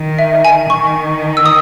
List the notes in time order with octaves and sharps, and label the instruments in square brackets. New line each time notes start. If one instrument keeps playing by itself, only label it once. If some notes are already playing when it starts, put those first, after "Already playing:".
Already playing: [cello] D#3
[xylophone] E5
G#5
[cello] D#3 [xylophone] C#6
[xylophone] E6
D#6